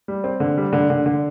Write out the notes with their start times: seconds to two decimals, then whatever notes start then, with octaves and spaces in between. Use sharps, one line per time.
0.08 G3
0.24 C4
0.40 D3
0.57 G3
0.73 D3
0.90 D3
1.06 D3